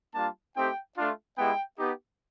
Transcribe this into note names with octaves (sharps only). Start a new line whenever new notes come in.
G3 A#3 D4 F4 A5
A3 C4 D#4 G4 G5
A3 D4 F4
G#3 B3 E4 G4 G5
B3 D#4 G4